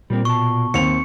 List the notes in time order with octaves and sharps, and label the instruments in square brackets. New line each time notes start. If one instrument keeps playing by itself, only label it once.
[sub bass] A#2 [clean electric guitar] G3 A#3 C4
[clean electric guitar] B2 A5 [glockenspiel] C#6
[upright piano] D#2 C4 F7 [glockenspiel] C#7